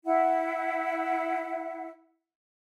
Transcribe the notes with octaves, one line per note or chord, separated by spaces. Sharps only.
E4 E5 F#5